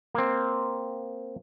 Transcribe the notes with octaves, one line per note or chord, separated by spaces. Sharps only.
A#3 C4